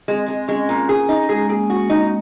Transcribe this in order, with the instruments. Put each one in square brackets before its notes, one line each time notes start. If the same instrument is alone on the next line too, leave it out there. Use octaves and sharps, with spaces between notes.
[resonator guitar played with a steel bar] G#3 [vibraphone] C4
[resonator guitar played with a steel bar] G#3
[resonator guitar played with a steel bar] G#3 [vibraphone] C#4
[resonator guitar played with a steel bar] A#2
G#4
D#4
[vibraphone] G#3 [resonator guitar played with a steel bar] G#4
[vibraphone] A#3 [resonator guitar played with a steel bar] G#4
[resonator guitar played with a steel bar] F#4
D#4